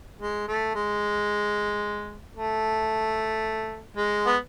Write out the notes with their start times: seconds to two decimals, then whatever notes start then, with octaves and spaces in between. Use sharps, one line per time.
0.21 G#3
0.48 A3
0.75 G#3
2.36 A3
3.97 G#3
4.26 B3